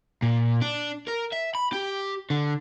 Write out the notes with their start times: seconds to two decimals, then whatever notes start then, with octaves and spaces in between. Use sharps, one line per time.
0.22 A#2
0.62 D4
1.08 A#4
1.33 E5
1.55 B5
1.73 G4
2.30 D3